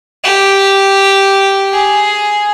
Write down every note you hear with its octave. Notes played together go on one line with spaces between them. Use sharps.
G4
G#4